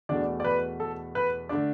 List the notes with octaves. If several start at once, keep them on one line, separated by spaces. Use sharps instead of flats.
E2 B2 A3 D4 D5
D5
B4
A4
B4
D3 A3 D4 D5